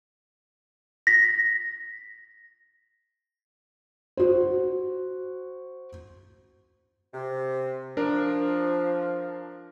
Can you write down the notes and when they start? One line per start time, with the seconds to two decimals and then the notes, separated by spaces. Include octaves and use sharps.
1.07 A#6 B6
4.17 F#4 C5
7.14 C3
7.97 F3 D4 A#4